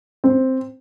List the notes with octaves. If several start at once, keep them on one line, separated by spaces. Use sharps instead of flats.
C4